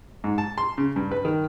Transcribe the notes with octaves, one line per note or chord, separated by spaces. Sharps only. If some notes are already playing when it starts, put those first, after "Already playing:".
G#2
A5
C6
C#3
G2
B4
D#3